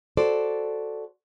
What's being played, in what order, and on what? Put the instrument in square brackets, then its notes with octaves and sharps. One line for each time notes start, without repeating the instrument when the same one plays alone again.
[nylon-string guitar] F#4 A4 C5 D5